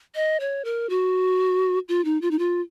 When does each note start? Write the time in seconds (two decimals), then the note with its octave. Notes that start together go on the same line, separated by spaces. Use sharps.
0.15 D#5
0.40 C#5
0.65 A#4
0.90 F#4
1.89 F4
2.05 D#4
2.22 F4
2.31 D#4
2.39 F4